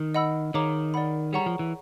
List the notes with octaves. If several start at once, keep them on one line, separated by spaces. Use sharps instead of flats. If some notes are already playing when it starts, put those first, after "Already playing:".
Already playing: D#3
D#5 F#5 B5 E6
D#3 G#4 C#5 F5 A#5 D6
A#4 D5 F#5 B5
G3 G#4 C#5 F#5 A#5 C#6
F3
E3